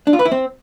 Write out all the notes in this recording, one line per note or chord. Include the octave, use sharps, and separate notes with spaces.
D4
F4
B4
E4
C4